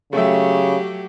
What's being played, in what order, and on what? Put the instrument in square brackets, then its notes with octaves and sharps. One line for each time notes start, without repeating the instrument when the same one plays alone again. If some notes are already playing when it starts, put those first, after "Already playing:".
[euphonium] C#3 [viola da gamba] F#3 G4 [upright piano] A3 E5